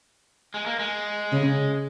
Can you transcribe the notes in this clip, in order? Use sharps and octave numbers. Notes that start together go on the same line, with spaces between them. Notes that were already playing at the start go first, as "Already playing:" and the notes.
G#3
A#3
G#3
C#3